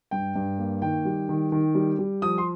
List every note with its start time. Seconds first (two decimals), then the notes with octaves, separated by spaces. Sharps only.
0.11 G2 G5
0.36 G2
0.59 A#3
0.82 D#3 G5
1.05 G3
1.29 D#3
1.52 D#3
1.75 G3
1.99 G3
2.22 F3 D#6
2.38 C6